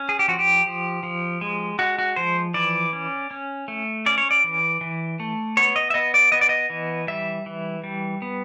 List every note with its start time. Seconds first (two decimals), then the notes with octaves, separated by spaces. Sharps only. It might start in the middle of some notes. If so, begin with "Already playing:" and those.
Already playing: C#4
0.09 G#4
0.19 G4
0.28 F3 F#4
0.39 G4
0.66 F3
1.03 F3
1.41 G#3
1.79 G#3 F#4
1.99 F#4
2.16 F3 C5
2.54 E3 D5
2.93 C#4
3.31 C#4
3.68 A3
4.06 C#4 D5
4.18 C#5
4.31 D5
4.44 E3
4.81 E3
5.20 A3
5.57 B3 C#5
5.76 D#5
5.90 E5
5.94 B3 D#5
6.14 D5
6.32 B3 D#5
6.41 D5
6.49 D#5
6.70 E3
7.07 G3 E5
7.46 E3
7.84 G3
8.22 B3